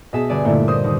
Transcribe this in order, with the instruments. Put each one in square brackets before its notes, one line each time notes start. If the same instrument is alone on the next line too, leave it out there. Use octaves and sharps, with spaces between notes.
[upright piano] B2 G#4 [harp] D#5 E5 A5
[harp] G1 D5 G#5
[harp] G2 A#2 D3 [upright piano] A3 A#3 E4
[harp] C5 D#5 [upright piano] D#6
[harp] D#2